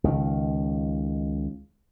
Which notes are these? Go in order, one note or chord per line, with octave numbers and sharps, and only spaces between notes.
C#2 D#3